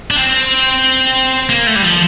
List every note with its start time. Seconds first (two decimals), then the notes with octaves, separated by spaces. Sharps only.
0.11 D4
0.16 C4
1.49 A#3
1.67 A3
1.76 G3
1.83 F3